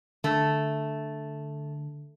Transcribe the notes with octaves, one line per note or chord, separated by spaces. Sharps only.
D3 A3